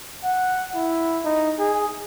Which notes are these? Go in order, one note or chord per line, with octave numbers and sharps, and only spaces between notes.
F#5
E4
D#4
G#4